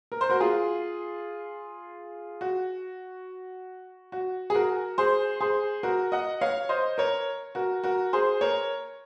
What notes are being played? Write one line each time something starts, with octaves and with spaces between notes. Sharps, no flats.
A#4
C5
F#4 A#4
F4 G#4
F#4
F#4
G#4
F#4 A#4
G#4 C5
G#4 C5
F#4 A#4
D#5 F#5
C#5 F5
C5 D#5
A#4 C#5
F#4 A#4
F#4 A#4
G#4 C5
A#4 C#5